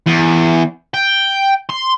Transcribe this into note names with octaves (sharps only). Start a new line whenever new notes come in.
E2
G5
C6